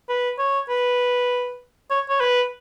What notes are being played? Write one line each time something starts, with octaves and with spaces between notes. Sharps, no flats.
B4
C#5
B4
C#5
C#5
B4